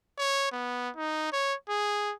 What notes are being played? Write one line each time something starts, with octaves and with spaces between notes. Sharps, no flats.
C#5
B3
D#4
C#5
G#4